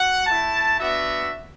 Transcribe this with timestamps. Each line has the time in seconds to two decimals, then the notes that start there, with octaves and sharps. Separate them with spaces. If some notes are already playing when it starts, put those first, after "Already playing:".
Already playing: F#4 F#5
0.27 A3 E4 A5
0.80 B3 D4 F#4 E5